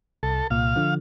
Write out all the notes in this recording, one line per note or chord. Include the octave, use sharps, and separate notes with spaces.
C2 A4
C2 A#2 F5
D3 F3